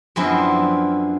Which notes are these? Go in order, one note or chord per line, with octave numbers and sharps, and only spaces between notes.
F#2 D3 F3 B3 C4 E4